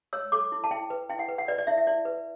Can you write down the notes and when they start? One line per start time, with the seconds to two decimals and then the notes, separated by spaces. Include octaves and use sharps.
0.13 C#5 E6
0.32 A4 D6
0.52 E4
0.64 A5
0.71 E4 G5
0.90 B4
1.09 E4 G5
1.19 F#5
1.29 B4
1.38 F#5
1.48 B4 D5
1.58 D5
1.67 E4 E5
1.77 E5
1.87 E4 D5
2.05 B4